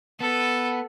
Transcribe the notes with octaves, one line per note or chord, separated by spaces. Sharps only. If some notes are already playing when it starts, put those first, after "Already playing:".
B3 A4